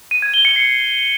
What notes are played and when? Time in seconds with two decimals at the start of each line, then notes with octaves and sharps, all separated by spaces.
0.11 D#7
0.22 G#6
0.34 G7
0.45 C#7
0.56 C7